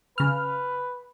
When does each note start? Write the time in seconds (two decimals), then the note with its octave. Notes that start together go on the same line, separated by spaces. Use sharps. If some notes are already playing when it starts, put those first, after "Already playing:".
0.18 C#3 B4 F6